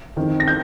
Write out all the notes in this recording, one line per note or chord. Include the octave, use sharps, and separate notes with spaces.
F2 D#3
A#6
G6